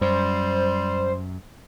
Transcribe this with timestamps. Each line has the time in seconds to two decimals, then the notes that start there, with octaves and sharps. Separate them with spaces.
0.01 F#2 G3 C5